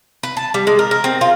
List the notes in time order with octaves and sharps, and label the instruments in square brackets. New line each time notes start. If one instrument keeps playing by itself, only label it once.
[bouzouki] B4
A5
G3
G#3
A#4
A#4
C4
F4